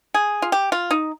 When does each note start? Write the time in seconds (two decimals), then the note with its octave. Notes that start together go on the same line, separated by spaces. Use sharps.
0.14 G#4
0.42 F4
0.52 G4
0.72 F4
0.91 D#4